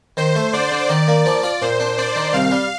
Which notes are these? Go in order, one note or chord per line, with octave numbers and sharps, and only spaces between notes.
D#3 C5
A3
D3 D5
D3
D#3
A#3
F3 D5
F4
A#2 C5
D4
D4 D5
D#3
C2 F5
G3